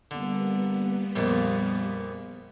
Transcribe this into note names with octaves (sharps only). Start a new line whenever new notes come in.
D3 G3 A#3 B3
A#1 F2 A#2